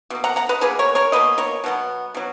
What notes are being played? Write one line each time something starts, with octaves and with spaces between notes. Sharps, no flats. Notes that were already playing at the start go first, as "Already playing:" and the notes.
B2 A#3
F#5 A#5
F#5 A#5
B4 D#5
B2 A#3 G#4 B4
A#4 C#5
A#4 C#5
B2 A#3 B4 D#5
A#4 C#5
B2 F#3 B3
B2 F#3